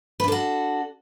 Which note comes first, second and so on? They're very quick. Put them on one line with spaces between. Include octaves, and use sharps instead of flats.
B4 D4 A4 F#4